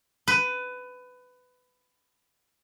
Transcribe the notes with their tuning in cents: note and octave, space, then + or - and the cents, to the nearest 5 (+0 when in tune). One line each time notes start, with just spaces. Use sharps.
B4 +20